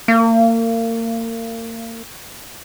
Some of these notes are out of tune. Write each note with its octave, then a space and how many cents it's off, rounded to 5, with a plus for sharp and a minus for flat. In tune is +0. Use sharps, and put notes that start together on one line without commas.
A#3 -35